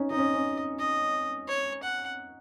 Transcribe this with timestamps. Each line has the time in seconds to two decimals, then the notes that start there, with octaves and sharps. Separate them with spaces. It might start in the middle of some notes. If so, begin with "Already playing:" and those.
Already playing: C#4 D#4
0.11 D#4 D#5
0.18 C#4
0.34 C#4
0.79 D#5
1.48 C#5
1.83 F#5